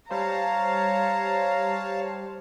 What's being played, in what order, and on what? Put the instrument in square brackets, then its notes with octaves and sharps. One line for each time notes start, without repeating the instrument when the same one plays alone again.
[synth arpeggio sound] G3 C5 [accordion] C#5 F5 A5 [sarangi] A#5